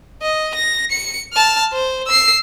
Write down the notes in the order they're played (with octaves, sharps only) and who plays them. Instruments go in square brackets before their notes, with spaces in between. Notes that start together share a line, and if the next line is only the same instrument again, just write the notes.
[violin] D#5
A#6
C#7
A5 F6
C5
E6 C7